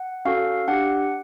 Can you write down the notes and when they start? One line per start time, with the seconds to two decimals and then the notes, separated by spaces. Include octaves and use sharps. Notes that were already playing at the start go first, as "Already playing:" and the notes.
Already playing: F#5
0.25 C#4 F#4 A4 F5
0.68 D4 G4 F#5